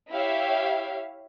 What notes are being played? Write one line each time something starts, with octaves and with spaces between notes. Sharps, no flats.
E4 G4 C#5 E5 F5